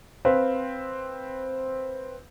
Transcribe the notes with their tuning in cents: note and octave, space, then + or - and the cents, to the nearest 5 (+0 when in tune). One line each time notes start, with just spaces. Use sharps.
C4 +0 B4 +0 F5 +0